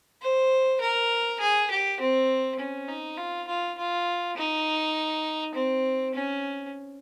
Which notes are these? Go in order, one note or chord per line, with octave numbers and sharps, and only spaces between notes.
C5
A#4
G#4
G4
C4
C#4
D#4
F4
F4
F4
D#4
C4
C#4